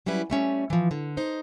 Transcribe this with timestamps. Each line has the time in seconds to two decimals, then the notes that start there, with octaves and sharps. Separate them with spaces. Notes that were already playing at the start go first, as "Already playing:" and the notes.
0.06 F#3 G3 C#4 E4 B4
0.30 G3 A3 C#4
0.70 E3 F3
0.91 D3
1.17 D#4 C5